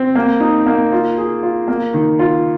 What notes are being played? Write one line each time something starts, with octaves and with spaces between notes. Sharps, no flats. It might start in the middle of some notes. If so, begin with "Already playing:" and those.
Already playing: C4
A#3
D#4
A#3
F4
G#4
F4
A#3
D#3
F4